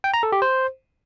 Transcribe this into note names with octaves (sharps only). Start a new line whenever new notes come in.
G5
A#5
A4
G4
C5